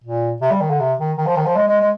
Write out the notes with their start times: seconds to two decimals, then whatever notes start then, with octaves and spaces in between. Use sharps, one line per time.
0.04 A#2
0.42 C3
0.51 G3
0.61 D#3
0.70 D3
0.80 C3
0.99 D#3
1.17 D#3
1.27 F3
1.37 D#3
1.46 F3
1.56 G#3
1.68 G#3
1.81 G#3